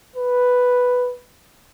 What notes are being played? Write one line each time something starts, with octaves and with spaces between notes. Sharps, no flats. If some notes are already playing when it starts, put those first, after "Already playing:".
B4